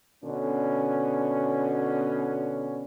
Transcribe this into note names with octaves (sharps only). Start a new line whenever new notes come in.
B2 D3 C#4